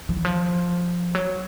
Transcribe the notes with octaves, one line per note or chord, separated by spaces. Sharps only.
F3
E3
F3
F#3